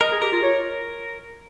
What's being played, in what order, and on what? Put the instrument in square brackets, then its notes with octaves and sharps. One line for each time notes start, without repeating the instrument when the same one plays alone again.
[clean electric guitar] A#4 [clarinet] D#5
[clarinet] G#4
[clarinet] G4 [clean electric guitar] A#4
[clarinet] F4
C#5